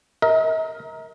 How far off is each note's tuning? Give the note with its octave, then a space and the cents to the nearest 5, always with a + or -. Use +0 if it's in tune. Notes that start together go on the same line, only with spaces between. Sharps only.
A#4 +0 D#5 +45